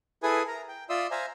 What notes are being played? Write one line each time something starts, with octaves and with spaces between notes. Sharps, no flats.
E4 G#4 A4 B4 G#5 D#6
A#4 A#5
G5
F4 D5 E5 C6 D#6 E6
C5 E5 F5 G#5 A#5